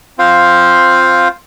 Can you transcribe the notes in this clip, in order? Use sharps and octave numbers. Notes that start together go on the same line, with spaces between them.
C4 F4 C5 F5